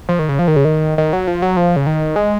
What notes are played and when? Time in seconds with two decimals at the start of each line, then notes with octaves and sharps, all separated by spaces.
0.09 F3
0.19 D#3
0.29 C#3
0.39 F3
0.48 D#3
0.56 C#3
0.65 D#3
0.98 D#3
1.13 F#3
1.27 F3
1.42 F#3
1.57 F3
1.76 C#3
1.86 D#3
2.16 G#3